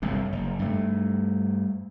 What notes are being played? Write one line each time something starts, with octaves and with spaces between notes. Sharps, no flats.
G1 C2 F#2 A2
F#1
G2 A3